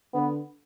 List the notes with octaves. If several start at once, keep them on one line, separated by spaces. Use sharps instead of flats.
D3 B3